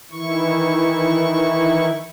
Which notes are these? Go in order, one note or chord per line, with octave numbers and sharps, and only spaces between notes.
D#3 E3 E4 C#6